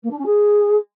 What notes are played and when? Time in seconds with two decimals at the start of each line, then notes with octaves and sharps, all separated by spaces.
0.03 A#3
0.10 D4
0.18 C#4
0.25 G#4